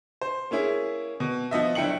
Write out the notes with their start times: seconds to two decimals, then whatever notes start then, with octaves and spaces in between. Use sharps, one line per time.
0.22 C5
0.51 A#3 C#4 E4 G#4
1.20 B2
1.51 F3 B3 D#5 E5
1.75 F#1 D4 E4 G5 C#7 F#7